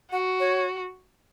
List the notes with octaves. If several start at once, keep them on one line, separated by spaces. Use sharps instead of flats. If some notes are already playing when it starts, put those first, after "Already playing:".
F#4 F#5
C#5